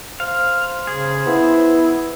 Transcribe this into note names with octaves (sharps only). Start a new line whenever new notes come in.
C5 F5
C#3 G#4
B3 E4